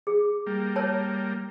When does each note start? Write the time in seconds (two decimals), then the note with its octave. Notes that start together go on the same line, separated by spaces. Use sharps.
0.07 G#4
0.47 G3 A#3
0.76 A#4 C#5 A5